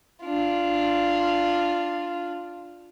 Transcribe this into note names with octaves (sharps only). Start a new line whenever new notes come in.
D4 F4